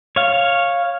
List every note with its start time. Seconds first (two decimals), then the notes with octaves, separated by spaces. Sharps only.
0.16 C#5 F5